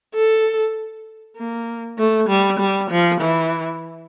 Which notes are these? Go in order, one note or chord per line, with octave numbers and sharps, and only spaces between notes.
A4
A#3
A3
G3
G3
F3
E3